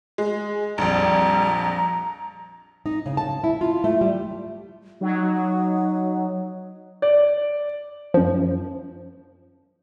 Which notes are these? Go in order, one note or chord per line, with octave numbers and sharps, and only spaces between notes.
G#3
A#1 F2 G3 A#5
D#4
C#3
A5
E4
F4
A3
G3
F#3 D#4
D5
F#2 F3